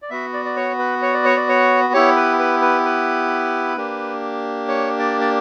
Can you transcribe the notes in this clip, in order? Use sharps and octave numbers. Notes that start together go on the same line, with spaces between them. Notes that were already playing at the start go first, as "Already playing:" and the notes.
D5
B3 F#4 E5
D5
D5
C#5
B4
C#5
D5
C#5
D5
C#5
B3 E4 G4 C#5
B4
B4
B4
B4
A#3 D4 G4
C#5
D5
D5